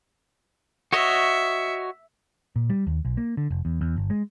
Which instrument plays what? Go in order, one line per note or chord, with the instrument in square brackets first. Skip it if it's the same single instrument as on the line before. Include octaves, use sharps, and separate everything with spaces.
[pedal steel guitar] F#4 C#5 D#5 [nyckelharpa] E5
[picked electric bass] A#2
G3
D#2
B1
A#3
D3
F1
E2
E2
G1
G#3